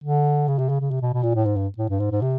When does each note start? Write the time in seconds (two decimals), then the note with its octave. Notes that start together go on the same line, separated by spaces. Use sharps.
0.04 D3
0.48 C#3
0.58 C3
0.69 C#3
0.80 C#3
0.91 C3
1.02 B2
1.13 B2
1.23 A#2
1.35 A2
1.45 G#2
1.56 G2
1.78 A2
1.89 G2
2.00 G#2
2.11 G#2
2.22 C3